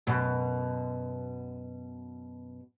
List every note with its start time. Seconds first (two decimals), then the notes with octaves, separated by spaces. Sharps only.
0.07 F#2 B2